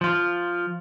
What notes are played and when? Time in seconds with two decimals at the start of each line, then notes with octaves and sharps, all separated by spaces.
0.01 F3 F4